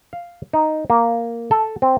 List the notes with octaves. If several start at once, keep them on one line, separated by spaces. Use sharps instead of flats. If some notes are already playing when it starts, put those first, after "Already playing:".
F5
D#4
A#3
A4
C4